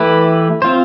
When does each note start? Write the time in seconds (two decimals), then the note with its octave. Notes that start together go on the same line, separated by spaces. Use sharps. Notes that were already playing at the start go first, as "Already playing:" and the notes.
Already playing: E3 A3 E4 G4 B4
0.62 C4 F4 C5